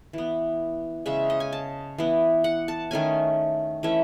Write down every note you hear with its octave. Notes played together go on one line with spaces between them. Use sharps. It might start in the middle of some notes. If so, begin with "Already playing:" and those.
E3 B3
C#3 G#3 C#4 E5
D#5
G#5
A5
E3 B3
F#5
A5
D#3 A3 C#4 G#5
E3 A3 C#4 E5